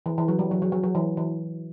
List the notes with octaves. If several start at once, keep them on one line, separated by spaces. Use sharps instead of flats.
E3
E3
F#3
G3
F#3
F#3
F#3
F#3
E3
E3